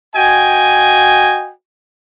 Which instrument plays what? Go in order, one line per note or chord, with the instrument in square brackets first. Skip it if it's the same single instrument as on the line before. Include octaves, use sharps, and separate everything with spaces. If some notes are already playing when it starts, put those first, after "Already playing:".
[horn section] F#4 D#5 G5 G#5